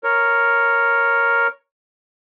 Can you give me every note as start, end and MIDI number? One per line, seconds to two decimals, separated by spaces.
0.04 1.47 70
0.04 1.47 73